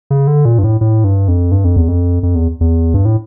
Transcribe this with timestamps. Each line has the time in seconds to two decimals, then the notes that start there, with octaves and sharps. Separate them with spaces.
0.10 C#3
0.27 D3
0.45 A#2
0.59 G2
0.64 A2
0.81 A2
1.04 G2
1.28 F2
1.52 G2
1.64 F2
1.76 E2
1.88 F2
2.23 F2
2.35 E2
2.61 E2
2.94 G2
3.05 A2